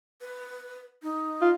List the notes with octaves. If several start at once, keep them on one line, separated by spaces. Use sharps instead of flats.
B4
D#4
F4